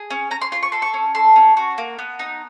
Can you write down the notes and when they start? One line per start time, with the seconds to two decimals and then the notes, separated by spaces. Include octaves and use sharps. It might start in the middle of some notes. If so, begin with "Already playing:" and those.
Already playing: G#4
0.10 C#4
0.31 C#4 A#5
0.41 C6
0.52 F4 C6
0.63 C#6
0.72 A4 C6
0.82 C#6
0.94 C#4
1.15 A4 C6
1.36 C#4
1.57 F#4
1.78 A#3
1.99 B3
2.19 D#4